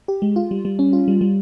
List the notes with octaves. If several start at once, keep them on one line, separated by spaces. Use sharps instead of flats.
G4
G#3
F4
G3
G3
C#4
F4
G3
G3